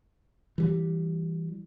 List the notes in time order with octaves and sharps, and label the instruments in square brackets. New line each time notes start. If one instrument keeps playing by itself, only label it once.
[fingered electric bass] E3 G3